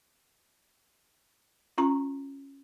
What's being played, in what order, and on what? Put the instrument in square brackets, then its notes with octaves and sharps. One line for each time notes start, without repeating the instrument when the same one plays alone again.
[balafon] C#4 F4 A#5 C#6